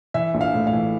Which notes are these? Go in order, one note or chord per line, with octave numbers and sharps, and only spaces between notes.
E3 E5
A#1
F5
A2
F5
E3